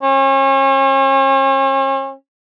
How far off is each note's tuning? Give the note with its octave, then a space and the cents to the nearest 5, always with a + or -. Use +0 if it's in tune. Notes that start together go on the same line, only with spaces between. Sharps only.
C#4 -40